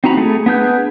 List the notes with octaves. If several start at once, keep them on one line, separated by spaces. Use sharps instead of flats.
C4 D#4 F#4 A#5 B5
A3 G#4
B3 D4 G#4 B4 G6